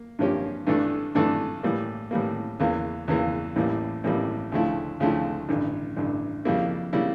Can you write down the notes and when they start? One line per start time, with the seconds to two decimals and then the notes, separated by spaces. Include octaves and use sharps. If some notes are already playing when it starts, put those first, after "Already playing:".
Already playing: A#3
0.19 G2 F3 A#3 C#4 G4
0.67 G2 E3 A3 D4 A4
1.15 G2 E3 A3 D4 A4
1.63 A2 E3 G3 A#3
2.11 A2 E3 G3 A#3
2.60 E2 C#3 E3 A#3
3.08 E2 C#3 E3 A#3
3.56 A1 A2 E3 G3 A#3
4.04 A1 A2 E3 G3 A#3
4.52 D2 C#3 F3 A3 E4
5.00 D2 C#3 F3 A3 E4
5.49 A1 G2 D3
5.96 A1 G2 D3
6.45 F2 C#3 G3 A#3 E4
6.93 C#3 G3 A#3 E4